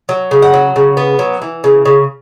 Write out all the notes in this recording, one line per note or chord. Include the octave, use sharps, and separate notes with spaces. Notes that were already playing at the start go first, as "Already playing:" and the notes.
F#3
C#3
F#5
F#3
C#3
B3
F#3
E3
C#3
C#3